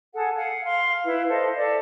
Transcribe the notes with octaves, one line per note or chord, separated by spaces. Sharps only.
G#4 A4 F#5
F5 F#5 G#5
F5 C6
E4 B4
A4 C5 D#5 F5
A4 D5 E5